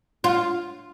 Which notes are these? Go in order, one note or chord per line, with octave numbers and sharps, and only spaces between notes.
F4